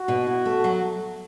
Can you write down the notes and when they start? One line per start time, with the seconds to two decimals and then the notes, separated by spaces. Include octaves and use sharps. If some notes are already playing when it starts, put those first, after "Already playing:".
Already playing: F#4
0.08 B2
0.27 E4
0.46 A3
0.64 F#3